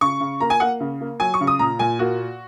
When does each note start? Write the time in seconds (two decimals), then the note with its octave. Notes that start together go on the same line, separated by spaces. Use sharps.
0.01 C#3 C#6
0.20 C#3
0.40 A#3 A#5
0.50 G#5
0.60 A#3 F#5
0.80 C#3
1.01 A#3
1.20 F#3 G#5
1.34 C#6
1.41 C#3
1.47 D#6
1.59 A#2 A#5
1.79 A#2 G#5
1.99 A#3 F#4